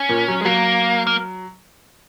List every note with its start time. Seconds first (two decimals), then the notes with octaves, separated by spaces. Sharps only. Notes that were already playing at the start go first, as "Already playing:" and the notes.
Already playing: C#4
0.09 A#2
0.28 F#3
0.41 G#3
0.45 F#3 A#3
1.07 A#3